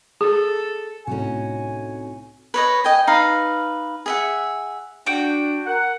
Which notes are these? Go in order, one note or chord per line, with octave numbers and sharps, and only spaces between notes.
G#4 A4
C2 A2 C#4 D#4 F#4 G#5
B4 C#5 D#5
D#5 G5 G#5
D#4 B4 F5
G#4 E5 F#5
D4 F#4 G5
A#4 F#5